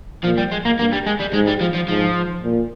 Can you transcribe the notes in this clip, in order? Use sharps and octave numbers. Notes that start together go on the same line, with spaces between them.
A#2 F3
G3
G#3
A#3
G2 A#3
G3
G#3
G3
G#2 G#3
G3
F3
F3
G#2 F3
A#2